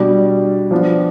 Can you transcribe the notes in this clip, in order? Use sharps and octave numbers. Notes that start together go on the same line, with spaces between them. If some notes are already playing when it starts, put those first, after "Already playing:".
Already playing: B2 G3 D4
F3 B3 D4 F4